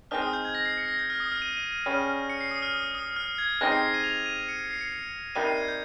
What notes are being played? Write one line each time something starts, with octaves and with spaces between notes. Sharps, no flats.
G#3 C4 D#4 F6
D#6
G6
G#6
A#6
C7
C#7
A#6
G6
F6
D#6
F6
D#7
D#7
D#7
C#3 G3 C#4
C#7
C7
D#6
F6
D#6
D#6
F6
G#6
G#3 C4 D#4 G4 A#6
C7
C7
D#7
F7
D#7
C#7
C#7
C7
C#7
C#7
C3 G3 A#3 D#4 D#7
C7
G#6
G6